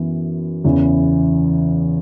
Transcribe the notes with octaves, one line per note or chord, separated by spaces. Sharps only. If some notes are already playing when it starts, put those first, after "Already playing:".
Already playing: F#2 E3 B3
E2 C#3 E3